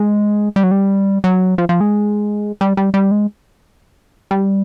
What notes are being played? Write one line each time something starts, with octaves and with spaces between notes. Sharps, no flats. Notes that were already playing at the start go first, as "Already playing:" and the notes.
Already playing: G#3
G3
F#3
G3
F#3
F3
F3
G#3
G3
G3
G3
G#3
G3